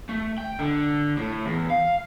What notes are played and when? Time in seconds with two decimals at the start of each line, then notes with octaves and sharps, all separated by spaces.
0.09 A3
0.38 G5
0.59 D3
1.17 A2
1.46 E2
1.70 F5